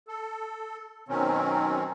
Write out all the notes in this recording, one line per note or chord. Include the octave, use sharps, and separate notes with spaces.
A4
B2 D#3 F#3 C4 C#4